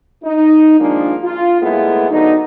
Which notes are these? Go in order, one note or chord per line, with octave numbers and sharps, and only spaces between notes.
D#4
D#3 F3 G#3 A#3 D4
F4
A2 G#3 A#3 B3 E4 G#4
D3 F#3 B3 D#4